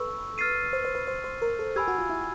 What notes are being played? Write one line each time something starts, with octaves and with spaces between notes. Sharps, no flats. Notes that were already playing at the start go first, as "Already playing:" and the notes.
Already playing: A4 B4 C#6 E6
F6 A6 C7 D#7
C5
C5
B4
C5
C5
A#4
A4
G4 G#5 B5 E6 G#6
F#4
F4
E4